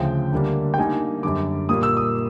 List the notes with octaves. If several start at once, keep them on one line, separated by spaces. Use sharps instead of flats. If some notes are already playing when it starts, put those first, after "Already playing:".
Already playing: D2 C#3 F3 G5
D2 D3 G3 A#3 D4
G5
D3 G3 A#3 D#4 G#5
F#2 D3 G3 D6
A#2 G3 A#3 D#6
E6
D#6